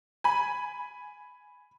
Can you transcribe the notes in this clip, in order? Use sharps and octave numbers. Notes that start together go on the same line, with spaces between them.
G#5 B5